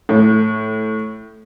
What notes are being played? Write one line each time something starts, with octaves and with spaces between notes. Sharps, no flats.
A2